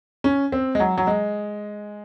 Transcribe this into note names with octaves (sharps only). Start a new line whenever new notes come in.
C#4
C4
G#3
F#3
F#3
G#3